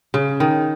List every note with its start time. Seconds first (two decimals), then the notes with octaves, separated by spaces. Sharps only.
0.14 C#3
0.40 D#3